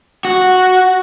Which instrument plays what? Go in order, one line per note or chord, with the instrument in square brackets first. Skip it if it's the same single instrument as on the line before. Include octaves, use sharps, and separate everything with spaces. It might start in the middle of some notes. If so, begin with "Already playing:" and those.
[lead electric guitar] F#4